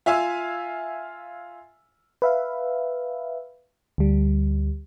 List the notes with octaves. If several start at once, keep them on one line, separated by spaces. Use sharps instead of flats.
F4 E5 F5 G#5 E6
B4 E5 F5
D2 G3